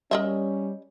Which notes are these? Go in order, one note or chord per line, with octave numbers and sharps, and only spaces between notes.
G3 C#4 A#4 D#5 E5